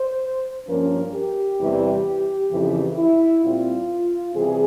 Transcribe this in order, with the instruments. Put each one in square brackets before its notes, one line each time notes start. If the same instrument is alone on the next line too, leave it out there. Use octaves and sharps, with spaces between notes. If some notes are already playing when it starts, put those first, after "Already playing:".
Already playing: [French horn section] C5
G2 F3 A#3 C#4 A#4
G4
E2 C3 E3 G3
F2 C#3 E3
E4
A#2 G3 C4 F4
C3 E3 G3 C4 G#4